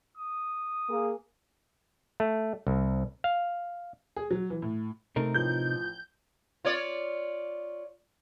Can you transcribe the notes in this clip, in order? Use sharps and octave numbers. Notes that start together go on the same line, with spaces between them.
D#6
A#3 G#4
A3
C2
F5
G#4
F#3
E3
A2
C3 A3 C4 D#4 A#4
A1 F3 B4 G6
F4 C#5 D5